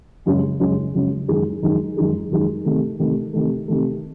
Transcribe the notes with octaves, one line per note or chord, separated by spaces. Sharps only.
F#2 C#3 G#3 C#4
F#2 C#3 G#3 C#4
F#2 C#3 G#3 C#4
F#2 D#3 G#3 D#4 G#4
F#2 D#3 G#3 D#4 G#4
F#2 D#3 G#3 D#4 G#4
F#2 D#3 G#3 D#4 G#4
C3 D#3 A3
C3 D#3 A3
C3 D#3 A3
C3 D#3 A3